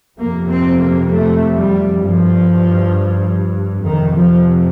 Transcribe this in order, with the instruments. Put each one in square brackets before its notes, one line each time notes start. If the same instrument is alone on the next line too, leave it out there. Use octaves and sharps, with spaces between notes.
[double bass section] F2 C3 A#3
C4
A#3
A3
G3
G2 F3
F2 C3 D#3
F3